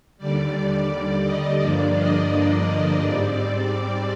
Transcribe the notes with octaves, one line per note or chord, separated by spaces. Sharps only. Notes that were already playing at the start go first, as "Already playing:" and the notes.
D#2 D3 G3 D5
D#5
G2 D3 F3 A#3 D4 D5
D#5
D#5
G#2 G3 C4 D5